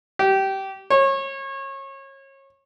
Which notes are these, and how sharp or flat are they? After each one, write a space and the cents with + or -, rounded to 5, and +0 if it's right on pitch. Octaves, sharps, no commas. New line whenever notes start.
G4 -20
C#5 -30